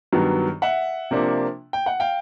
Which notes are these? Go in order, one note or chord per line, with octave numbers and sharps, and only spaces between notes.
G2 D#3 F#3 B3
E5 F#5
C3 F3 A#3 D4
G5
F#5
F5 G5